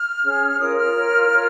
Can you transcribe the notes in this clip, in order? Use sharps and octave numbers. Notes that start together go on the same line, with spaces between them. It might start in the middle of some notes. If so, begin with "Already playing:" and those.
Already playing: F6
C#4 G#4 C#5
F4 A#4 C#5 D#6
F6
F4 A#4 C#5
F4 A#4 C#5